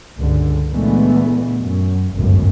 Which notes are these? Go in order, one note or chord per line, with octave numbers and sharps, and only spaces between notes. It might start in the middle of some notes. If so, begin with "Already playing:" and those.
C#2 G2 D3
A#2 D3 E3 G#3 A3 B3
F#2
G1 C#2 F#2 A2